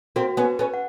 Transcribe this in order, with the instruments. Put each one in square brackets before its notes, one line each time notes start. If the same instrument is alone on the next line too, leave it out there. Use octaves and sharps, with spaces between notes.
[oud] A#3 C4 [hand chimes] F#4
[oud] B3 C#4
[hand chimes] B4
[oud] B3 C#4
[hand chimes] F#5